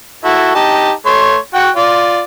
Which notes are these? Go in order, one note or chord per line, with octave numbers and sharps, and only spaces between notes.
E4 F#4 A4
D#4 G4 A5
A3 C#5 C6
F#4 F#5 G5
F4 D5